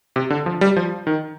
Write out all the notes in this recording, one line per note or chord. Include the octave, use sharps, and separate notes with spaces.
C3
D3
F3
G3
F3
D#3